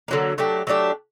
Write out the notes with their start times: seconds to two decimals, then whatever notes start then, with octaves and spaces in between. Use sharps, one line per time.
0.08 D3 F#3 A#3
0.38 F#3 A3 D4 G4
0.67 F#3 A3 D4 G4